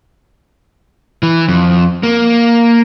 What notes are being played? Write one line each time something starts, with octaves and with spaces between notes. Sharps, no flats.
E3
F2
A#3